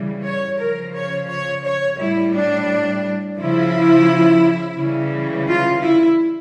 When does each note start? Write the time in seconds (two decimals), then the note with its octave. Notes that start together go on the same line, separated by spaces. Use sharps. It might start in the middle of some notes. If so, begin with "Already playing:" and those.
Already playing: C#3 E3 G3
0.23 C#5
0.58 C#3 F3 A#4
0.93 C#5
1.28 C#5
1.63 C#5
1.97 A2 G3 E4
2.32 D4
3.37 C#3 F3 E4
4.77 C#3 E3 G3
5.48 F4
5.81 E4